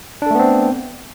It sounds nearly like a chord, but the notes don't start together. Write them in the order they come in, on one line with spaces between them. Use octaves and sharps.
D4 A4 A3 B3 C4